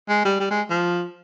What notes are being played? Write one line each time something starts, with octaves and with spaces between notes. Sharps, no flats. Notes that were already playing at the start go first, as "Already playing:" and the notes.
G#3
G3
G3
G#3
F3